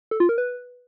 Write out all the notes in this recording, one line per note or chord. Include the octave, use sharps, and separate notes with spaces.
A4
F4
A#4
B4